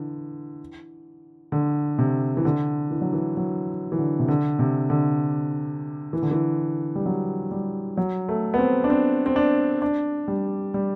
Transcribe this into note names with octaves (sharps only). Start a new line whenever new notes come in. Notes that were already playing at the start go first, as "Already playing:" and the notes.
Already playing: D3 E3
D3
C3
E3
D3
E3
F#3
E3
F#3
E3
D3
C3
D3
C3
D3
E3
D3
E3
G3
F#3
G3
F#3
A3
B3
C4
D4
C4
C4
D4
D4
G3
G3